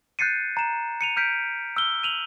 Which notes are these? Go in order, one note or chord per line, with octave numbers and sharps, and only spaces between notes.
F#6 G6 A6 C7 C#7 D#7
A#5 E7
C#7 D#7 F7
F6 G6 B6 D7
E6 F6 G7
D#7 F7 F#7